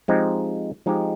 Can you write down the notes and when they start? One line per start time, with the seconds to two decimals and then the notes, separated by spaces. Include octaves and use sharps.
0.08 F3 G#3 C4 D#4 G4
0.86 F3 G#3 C4 D#4 G4